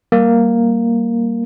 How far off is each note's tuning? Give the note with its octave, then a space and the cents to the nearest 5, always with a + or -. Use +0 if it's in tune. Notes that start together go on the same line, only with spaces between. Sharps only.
G3 -10 A#3 +0